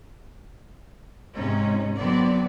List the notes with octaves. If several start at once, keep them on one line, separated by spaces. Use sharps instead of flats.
G#2 C3 G#3 C#4 D#4
D3 F#3 B3 C4 D5